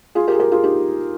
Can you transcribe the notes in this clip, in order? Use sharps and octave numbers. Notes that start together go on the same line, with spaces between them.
F4 G#4
G4 A#4
G#4
G4 A#4
F4 G#4
D#4 G4